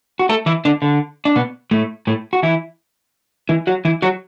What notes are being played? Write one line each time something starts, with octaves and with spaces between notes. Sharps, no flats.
F#4
A3 A4
E3 E4
D3 D4
D3
D4
B2 B3
A2 A3
A2 A3
F#4
E3 E4
E3 E4
F#3 F#4
E3 E4
F#3 F#4